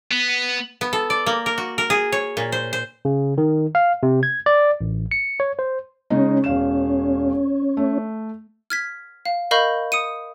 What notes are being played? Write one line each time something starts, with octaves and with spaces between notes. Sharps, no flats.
B3
B3
A4
D5
A#3
A#4
F#4
A#4
G#4
C#5
A#2
C5
C5
C#3
D#3
F5
C3
G#6
D5
A1
C#7
C#5
C5
C#3 G#3 C#4 D#4
E1 F5 E7
A3
F6 G#6 B6
F5
A#4 D#5 F5 B5 C#6 G6
D#6 C#7 D#7